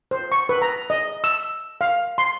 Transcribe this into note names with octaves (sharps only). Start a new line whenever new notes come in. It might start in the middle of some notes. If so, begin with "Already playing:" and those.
C5
C#6
B4
A#5
D#5
E6
F5
C6